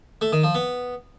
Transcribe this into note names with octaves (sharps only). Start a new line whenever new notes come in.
A3
D#3
F3
B3